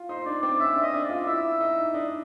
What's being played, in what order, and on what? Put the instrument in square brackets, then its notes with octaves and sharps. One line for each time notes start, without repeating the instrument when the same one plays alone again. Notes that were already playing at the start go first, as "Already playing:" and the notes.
Already playing: [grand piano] F4
[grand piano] D#4 [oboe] C5
[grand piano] D4 [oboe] D5
[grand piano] C4 [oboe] D5
[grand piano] C#4 [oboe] E5
[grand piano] D4
[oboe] D#5
[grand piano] D4
[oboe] D5
[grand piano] F4
[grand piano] E4 [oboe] E5
[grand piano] D#4
[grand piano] D4 [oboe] D#5